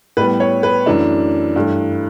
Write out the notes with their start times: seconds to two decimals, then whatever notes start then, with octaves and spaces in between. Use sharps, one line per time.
0.17 A2 G3 B3 B4
0.40 C#5
0.63 B4
0.86 F#2 E3 A3 D4
1.56 G2 E3 A3